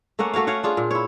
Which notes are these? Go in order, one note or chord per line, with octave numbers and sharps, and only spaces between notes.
A3 A#3 C#4 F#5
A3 F#4 C#5 F5
C#4 C#5 F5 F#5
D4 F4 G#4
A#2
E4 C#5